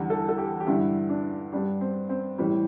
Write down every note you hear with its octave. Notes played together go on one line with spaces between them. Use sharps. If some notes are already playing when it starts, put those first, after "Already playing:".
Already playing: E2 D3 G3
A4
A4
G4
G4
G2 D3 G3 E4
D4
G2 G3 D4
C4
C4
A2 E3 G3